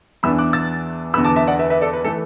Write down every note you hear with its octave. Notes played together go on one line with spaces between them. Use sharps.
E2 E3 B3 D4 B5 E6
D6 F#6
E6 A6
E2 D3 B3 B5 E6
A5 D6
E5 A5
D5 F#5
B4 E5
B4 E5
A4 D5
B4
E3 A3 A4